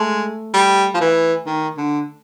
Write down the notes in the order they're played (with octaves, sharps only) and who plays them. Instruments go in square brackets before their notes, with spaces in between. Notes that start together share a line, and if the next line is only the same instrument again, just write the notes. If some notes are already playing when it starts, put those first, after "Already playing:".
Already playing: [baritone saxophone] G#3 [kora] A3
[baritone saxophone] G3
F3
E3
D#3
D3